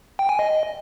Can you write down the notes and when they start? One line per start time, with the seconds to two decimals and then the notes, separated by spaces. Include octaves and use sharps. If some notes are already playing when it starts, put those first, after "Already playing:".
0.19 G5
0.29 G#5
0.39 D#5